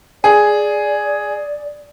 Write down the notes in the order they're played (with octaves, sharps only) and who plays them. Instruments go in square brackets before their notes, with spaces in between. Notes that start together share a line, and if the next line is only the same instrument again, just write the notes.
[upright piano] G#4 [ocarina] D5